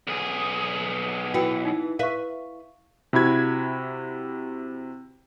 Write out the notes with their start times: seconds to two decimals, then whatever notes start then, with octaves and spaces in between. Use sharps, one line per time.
0.07 B1 G#4
1.34 E3 F#4 G5 C#7
1.65 D#4
1.99 B4 E5 F5 C#6
3.13 C3 E4 F#4 B5 G#6